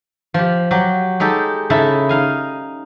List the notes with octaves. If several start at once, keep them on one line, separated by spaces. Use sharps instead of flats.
F3 G4
F#3 G4
G#3 D#4 G4 A4
C#3 D#4 E4 A4
D#4 F5 G#5